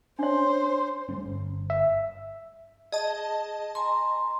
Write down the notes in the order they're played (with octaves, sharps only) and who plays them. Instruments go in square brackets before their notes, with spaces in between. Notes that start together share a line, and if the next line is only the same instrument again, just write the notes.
[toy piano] D4 C#5 [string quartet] C5
[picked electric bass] G3 A3 C#4
G1
[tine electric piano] E5
[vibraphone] G#4 [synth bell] D#5 A5
[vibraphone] G#5 A#5 C6